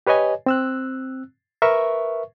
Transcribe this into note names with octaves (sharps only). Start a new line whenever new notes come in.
G4 B4 C#5 D#5 G#5
C4 E6 F#6
A#4 B4 E5 C#6